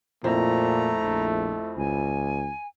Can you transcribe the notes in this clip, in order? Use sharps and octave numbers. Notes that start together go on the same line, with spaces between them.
F2 A#2 A3 C4 E4 A#5
A#1
C#2 G#5